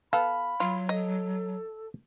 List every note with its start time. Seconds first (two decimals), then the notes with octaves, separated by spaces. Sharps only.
0.13 B3 A4 F5 B5
0.60 F#3 F4
0.89 A4 D#5